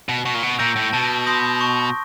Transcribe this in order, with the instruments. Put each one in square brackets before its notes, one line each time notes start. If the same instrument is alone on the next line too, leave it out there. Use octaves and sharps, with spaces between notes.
[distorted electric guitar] B2
[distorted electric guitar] B2 [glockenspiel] C#6
[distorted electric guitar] A#2
B2
[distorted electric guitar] A#2 [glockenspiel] E6 G6 A#6 D7
[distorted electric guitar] A2
[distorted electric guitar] B2 [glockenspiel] A5
[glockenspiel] C6 D#6 G6 A#6
C#6